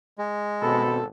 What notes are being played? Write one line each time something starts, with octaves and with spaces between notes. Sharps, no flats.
G#3
G#1 B2 C4 A4 B5